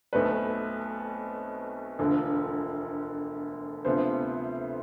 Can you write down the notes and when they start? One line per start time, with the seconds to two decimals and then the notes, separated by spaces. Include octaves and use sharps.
0.13 B1 B2 A3 C4 B4
1.99 E1 D2 D3 F3
3.85 D2 C3 F3 B3 C5